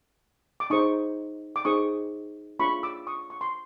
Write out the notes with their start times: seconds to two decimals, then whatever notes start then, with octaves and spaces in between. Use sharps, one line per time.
0.60 D6
0.70 D#4 G#4 C5 C#6 D#6
1.56 D6
1.65 D#4 G#4 C5 C#6 D#6
2.59 D4 F4 G#4 C#5 B5 C#6
2.83 D6 E6
3.07 C#6 D#6
3.30 C#6
3.41 C6